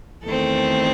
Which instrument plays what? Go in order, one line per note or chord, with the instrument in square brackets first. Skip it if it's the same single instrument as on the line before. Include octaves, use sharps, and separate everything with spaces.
[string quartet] E2 D#3 A3 C4 A4